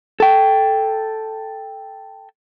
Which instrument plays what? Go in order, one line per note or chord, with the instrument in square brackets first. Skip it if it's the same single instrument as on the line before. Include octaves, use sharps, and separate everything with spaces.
[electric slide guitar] A4 G5